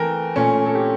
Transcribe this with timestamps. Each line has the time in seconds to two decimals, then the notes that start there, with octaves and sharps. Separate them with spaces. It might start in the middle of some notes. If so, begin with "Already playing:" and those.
Already playing: E3 A3 A#4 G5 A5
0.36 A#2 A3 C#4
0.66 A4
0.75 G4